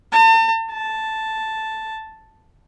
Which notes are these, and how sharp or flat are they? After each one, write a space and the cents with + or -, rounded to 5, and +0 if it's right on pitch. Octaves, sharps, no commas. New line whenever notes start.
A5 +40
A5 +0